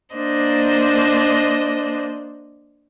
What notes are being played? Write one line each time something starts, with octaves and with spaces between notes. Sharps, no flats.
A#3 D4 C5 D#5